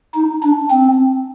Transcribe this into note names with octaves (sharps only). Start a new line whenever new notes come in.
D#4
D4
C4